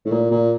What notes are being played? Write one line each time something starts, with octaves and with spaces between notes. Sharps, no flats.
A2
A#2
A#2